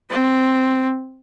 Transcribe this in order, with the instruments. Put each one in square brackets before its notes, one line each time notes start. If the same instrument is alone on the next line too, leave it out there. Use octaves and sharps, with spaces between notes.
[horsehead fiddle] C4